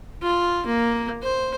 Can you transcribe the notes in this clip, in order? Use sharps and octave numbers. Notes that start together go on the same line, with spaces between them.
F4
A#3
C5